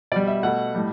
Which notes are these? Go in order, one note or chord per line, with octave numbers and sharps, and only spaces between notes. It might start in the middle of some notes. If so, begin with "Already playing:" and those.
B2 G3 D5
E5
B2 A3 F#5
A2 G3